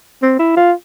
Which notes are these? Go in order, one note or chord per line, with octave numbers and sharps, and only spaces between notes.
C4
E4
F4